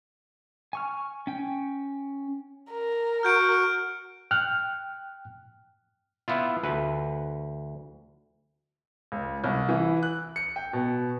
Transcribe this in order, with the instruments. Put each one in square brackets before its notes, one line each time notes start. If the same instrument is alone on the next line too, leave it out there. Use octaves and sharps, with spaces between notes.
[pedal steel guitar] G#5 C#6 F6
C#4 G5
[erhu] A#4
[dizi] F#4 [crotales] F6 G6 D7
[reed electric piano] G5 F6 F#6
[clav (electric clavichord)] B3 E4 F4
D2 B4
[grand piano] C#2
C2
E3
F#6
C#7
G5
B2